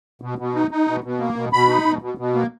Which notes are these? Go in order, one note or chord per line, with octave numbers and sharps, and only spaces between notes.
B2
B2
D#4
D#4
B2
B2
A#3
B2
B2 B5
D#4
B2
B2
B2
A#3